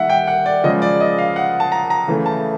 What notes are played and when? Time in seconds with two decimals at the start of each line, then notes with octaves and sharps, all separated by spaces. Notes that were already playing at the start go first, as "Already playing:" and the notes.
Already playing: D#3 G3 A#3 E5 F#5
0.10 G5
0.28 F#5
0.46 D5
0.64 C#3 F3 G#3 D#5
0.82 D5
1.00 D#5
1.18 F5
1.36 F#5
1.60 A5
1.72 A#5
1.90 A#5
2.08 C#3 E3 A3
2.26 A5